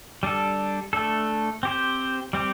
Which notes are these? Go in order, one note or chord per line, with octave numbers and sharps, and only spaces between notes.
G3 D4 A4
A3 D4 A4
C4 G4 C5
G3 C4 G4